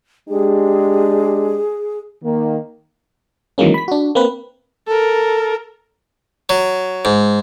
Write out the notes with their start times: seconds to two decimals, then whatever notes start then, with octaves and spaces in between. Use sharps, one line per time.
0.29 G#3 D4 G4 G#4
2.23 D#3 A#3
3.58 D#3 E3 F#3 G#3 A#3 C#4
3.74 B5 B6
3.88 D4 F#4
4.15 A#3 C4 B4
4.88 A4 A#4
6.49 F#3
7.05 G#2